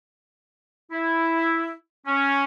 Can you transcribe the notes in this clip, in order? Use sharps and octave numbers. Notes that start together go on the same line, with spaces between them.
E4
C#4